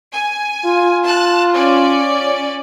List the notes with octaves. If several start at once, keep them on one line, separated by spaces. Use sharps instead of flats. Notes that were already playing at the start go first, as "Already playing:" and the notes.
G#5
F4
A5 F#6
C#4 D5